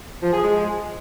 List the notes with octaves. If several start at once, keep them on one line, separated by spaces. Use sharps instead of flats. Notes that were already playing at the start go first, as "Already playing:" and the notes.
F3
G#4
G#3